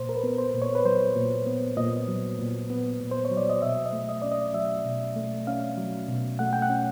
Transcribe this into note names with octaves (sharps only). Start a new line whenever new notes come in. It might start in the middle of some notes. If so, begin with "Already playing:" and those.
Already playing: A#2 C5
A#4
B4
B3
C5
A#2
C#5
B4
F#3 C5
A#2
B3
A#2 D#5
F#3
A#2
B3
A#2
C5
C#5
F#3
D5
D#5
B2 E5
D#5
A3
D#5
C#4 D5
D#5
F#3 E5
B2
A3
C#4 F5
F#3
B2
A3 F#5
G5
F#5
C#4